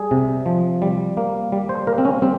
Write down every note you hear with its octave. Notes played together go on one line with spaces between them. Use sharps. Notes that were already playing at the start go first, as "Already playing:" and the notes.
Already playing: G3 G#4
C3
F3
G3
A#3
G3
C5
A#3 A#4
C4
C#4
G3 C4